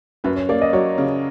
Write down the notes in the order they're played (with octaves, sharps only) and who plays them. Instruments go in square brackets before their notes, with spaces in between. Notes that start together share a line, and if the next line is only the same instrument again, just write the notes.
[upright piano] F#2 [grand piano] B4
[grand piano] C#5
[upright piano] A#3 [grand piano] D5
[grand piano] D#5
[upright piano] F#3 [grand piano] C#5
[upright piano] C#3